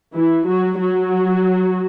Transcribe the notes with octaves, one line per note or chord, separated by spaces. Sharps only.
E3 E4
F#3 F#4
F#3 F#4